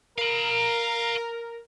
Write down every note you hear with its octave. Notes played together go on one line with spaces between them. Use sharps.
A#4 F5 B5